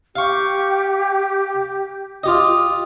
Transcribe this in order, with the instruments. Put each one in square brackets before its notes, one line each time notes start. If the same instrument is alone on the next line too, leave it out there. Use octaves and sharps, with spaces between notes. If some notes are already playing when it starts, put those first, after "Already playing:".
[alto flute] G4 [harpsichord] F5 C#6
[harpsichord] F4 G4 D#5